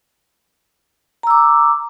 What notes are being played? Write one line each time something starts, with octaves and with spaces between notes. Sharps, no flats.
A#5 D6 E6